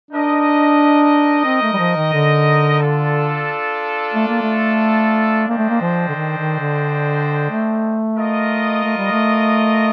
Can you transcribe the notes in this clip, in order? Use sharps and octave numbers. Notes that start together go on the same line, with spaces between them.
D4 D#4 A#4 D#5
C4
A3
G3
F3
D#3
D3
D4 F4 A4
A3
A#3
A3
A#3 D4 A4 C5 D#5 G5
A3
A#3
F3
D3
D#3
D#3
D3
A3
F4 A#4 D#5
A3
G3
A3